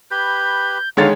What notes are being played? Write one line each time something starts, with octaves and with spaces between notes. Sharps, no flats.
G4 B4 B5 G6
D3 D#3 G#3 C#5 F5 A6